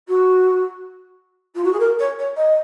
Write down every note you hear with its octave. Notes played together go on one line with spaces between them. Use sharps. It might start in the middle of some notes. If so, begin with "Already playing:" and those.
F#4
F4
F#4
G#4
A#4
C#5
C#5
D#5